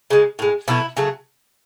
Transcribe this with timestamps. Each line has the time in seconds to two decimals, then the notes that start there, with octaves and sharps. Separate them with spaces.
0.10 C#3 G#3
0.39 A2 G#3
0.68 B2 F#3 A3 E4
0.97 C#3 F#3 A3